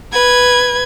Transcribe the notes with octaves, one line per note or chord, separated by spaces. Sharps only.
B4 G#6